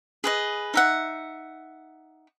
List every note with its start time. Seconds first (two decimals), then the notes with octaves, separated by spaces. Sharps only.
0.24 G#4 B4 D#5
0.74 D#4 E5 F#5